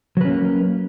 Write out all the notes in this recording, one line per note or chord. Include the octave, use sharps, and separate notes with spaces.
F#3 A#3 C#4 B4